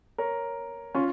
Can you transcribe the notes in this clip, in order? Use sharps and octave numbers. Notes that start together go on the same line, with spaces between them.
A#4 C#5
C#4 F4